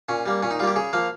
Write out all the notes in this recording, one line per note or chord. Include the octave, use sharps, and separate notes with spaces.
A#2 C#4
G3 A#3
A#2 C#4
D#4
G3 A#3 F4 G4
C#3 G#4
F3 A#3 F5